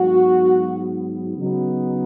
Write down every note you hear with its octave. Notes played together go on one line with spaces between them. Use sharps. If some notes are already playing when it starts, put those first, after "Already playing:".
Already playing: G#2 F#3 B3 F#4
C#3 F#3 B3 D#4